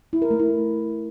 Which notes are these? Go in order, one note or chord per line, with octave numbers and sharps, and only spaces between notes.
E4
A#4
A3
E4